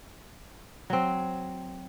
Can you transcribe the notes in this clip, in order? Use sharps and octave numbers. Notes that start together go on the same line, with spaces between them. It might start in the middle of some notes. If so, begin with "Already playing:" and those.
F#3 C4